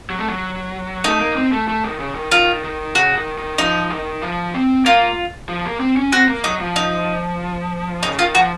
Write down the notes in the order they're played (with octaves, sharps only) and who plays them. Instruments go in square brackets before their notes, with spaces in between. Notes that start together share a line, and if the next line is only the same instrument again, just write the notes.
[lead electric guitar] F#3
A3
F#3
[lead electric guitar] A3 [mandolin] D#4
[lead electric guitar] A#3
C4
A3
A3
D#3
C#3
D#3
[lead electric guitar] D#3 [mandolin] F4
[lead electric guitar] D#3
[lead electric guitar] C#3 [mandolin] F#4
[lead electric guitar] D#3
D#3
[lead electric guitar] F3 [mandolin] D#4
[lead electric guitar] D#3
F3
C4
[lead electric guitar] A#3 [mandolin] F4
[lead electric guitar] F3
A#3
C4
C#4
[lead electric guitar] C4 [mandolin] F#4
[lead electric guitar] A#3
[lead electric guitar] F#3 [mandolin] D#4
[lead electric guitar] F3
[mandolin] D#4
[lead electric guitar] C#3 [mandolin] D#4
[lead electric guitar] D#3 [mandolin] F4
[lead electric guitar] F3 [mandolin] F#4